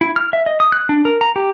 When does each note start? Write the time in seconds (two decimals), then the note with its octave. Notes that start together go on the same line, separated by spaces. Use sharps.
0.01 E4
0.16 F6
0.33 E5
0.46 D#5
0.60 D#6
0.72 F#6
0.89 D4
1.05 A#4
1.21 A#5
1.36 G4